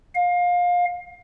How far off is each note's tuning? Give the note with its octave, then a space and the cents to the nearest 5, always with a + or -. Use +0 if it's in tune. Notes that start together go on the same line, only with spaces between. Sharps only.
F5 +25